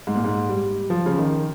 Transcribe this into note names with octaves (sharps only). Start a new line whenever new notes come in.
G#2
A#2
G#2
G3
F3
C#3
D#3